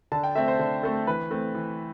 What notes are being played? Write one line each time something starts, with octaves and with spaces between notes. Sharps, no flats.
D3 A5
G5
A3 C4 E5
C5
D3
A3 C4 A4
E3 B4
A3 C4
E3